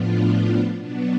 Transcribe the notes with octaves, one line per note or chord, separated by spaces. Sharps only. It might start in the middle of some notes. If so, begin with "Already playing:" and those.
Already playing: A2 F3 B3 D4 F4
B2 F#3 B3 D4